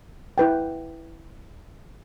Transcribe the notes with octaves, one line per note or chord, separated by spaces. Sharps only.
E4 B4 G5